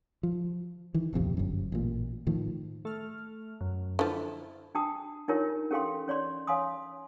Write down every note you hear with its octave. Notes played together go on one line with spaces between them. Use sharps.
F3
D#3 E3
D1 A#1 F2 C3
G1 F#2
A1 A#2
A2 D#3 F3
A3 F6
F#2
D3 F3 E4
D4 F#4 G5 A5 D#6
D4 D#4 F4 G4 A#4 C#5
C#4 G4 A4 F5 G5 C6
C#4 C#5 D5 C6
C#5 F5 G#5 C6 D#6